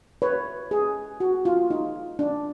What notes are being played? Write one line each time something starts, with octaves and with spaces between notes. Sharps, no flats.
B4 C#5
G#4
F#4
F4
D#4
D4